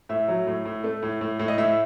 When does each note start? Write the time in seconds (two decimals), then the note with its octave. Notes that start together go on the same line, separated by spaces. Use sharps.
0.09 A2 E5
0.28 F#3
0.47 A2
0.65 A2
0.84 A3
1.03 A2
1.21 A2
1.39 A2
1.48 D#5
1.58 A2 E5